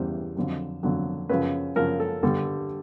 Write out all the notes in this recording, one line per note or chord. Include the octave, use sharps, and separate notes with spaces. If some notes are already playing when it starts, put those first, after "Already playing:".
Already playing: E2 C#3 E3 G3 C5
F2 D3 F#3
F2 D3 F#3
F#2 C#3 F3 B4
F#2 C#3 F3 A#4
A4
G2 D3 G3 A4